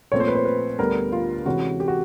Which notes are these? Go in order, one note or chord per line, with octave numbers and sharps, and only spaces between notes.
A#2 F3 A3 C4 C#5
C5
B4
C5
B4
D2 D3 G3 B3 A#4
F4
C3 E3 G#3 C#4 F#4
G4
F#4